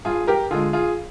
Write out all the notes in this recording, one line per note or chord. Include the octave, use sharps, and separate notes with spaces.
G2 F4 G#4
G4 A#4
D3 G#3 F4 G#4
F4 G#4